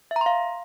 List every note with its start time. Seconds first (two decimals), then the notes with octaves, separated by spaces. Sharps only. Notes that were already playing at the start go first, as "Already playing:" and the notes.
0.11 E5
0.16 A#5
0.21 C6
0.26 F5